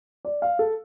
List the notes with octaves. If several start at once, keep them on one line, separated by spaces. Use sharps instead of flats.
D5
F5
A4